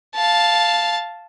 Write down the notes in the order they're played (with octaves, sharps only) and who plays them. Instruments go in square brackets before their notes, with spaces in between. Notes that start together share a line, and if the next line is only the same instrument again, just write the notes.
[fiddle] F5 A5